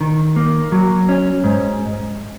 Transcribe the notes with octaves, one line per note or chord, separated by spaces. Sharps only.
D#3
A#3
F#3
C#4
G#2